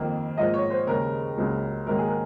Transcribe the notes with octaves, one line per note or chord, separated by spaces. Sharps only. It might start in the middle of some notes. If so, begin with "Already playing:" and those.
Already playing: F2 D#3 A#3
G#2 F3 A#3 D#5
C#5
C5
D#2 C#3 G#3 A#4
C#2 C#3 F#3 A#3
G#2 D#3 F#3 A#3 A#4
G#4
A#4